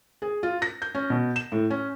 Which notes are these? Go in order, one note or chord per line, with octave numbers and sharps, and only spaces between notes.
G#4
F4
A#6
G6
C#4
B2
E7
A2
C#4